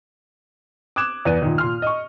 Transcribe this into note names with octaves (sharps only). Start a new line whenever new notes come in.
D6 D#6 F#6 G#6 E7
E2 B3 B4 D5 D#7
A#2 D#3
A#2 C6 F6
D#5 C#6